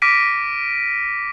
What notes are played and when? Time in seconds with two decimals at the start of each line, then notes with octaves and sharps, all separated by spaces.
0.02 D6 F6 A#6 B6 D7 D#7